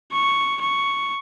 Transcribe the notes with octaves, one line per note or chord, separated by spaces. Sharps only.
C#6
C#6